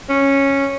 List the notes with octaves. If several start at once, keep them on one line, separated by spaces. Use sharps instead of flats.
C#4